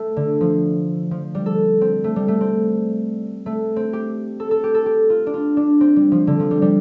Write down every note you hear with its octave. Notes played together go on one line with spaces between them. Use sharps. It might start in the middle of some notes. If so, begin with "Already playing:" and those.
Already playing: A3
D3
F3
F3
G3
A4
C4
A3
G3
A3
C4
A3
C4
G4
A4
A4
G4
A4
G4
F4
D4
F4
D4
C4
G3
F3
D3
F3
G3
G3